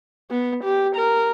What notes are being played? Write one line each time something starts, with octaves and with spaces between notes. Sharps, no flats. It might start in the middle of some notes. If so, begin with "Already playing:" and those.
B3
G4
A#4